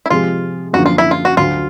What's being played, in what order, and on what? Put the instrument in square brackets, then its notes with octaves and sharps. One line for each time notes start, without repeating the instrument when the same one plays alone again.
[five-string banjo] E4
[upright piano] C3 F3 G#3 [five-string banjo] F4
[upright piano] F#2 D3 F3 A#3 [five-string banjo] F#4
[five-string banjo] F4
E4
F4
F#4
[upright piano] D2 D3 F#3 [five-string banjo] F4